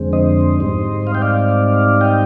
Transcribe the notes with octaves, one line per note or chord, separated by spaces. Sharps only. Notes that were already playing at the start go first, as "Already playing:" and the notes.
Already playing: F2 D3 G#3 C4
C5 D#5
G#2 G3 C4 D#4
F5
G5
D5 F5
D#5 G5